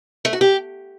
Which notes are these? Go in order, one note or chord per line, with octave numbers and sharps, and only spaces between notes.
A3
F#4
G4